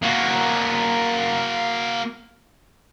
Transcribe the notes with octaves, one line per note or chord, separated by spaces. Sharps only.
A#3 F#4